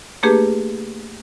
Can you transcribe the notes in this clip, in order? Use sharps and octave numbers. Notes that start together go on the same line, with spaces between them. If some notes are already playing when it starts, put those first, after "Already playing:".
A3 A#3 D4 G4 G#4 B4